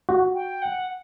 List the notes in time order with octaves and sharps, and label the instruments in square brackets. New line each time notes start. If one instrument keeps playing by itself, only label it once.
[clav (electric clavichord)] F#4
[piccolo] G5
F#5